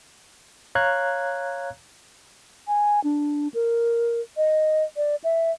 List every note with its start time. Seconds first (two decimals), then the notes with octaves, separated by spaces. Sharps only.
0.75 C#5 F5 A#5 F#6 G#6
2.67 G#5
3.04 D4
3.54 A#4
4.37 D#5
4.97 D5
5.24 E5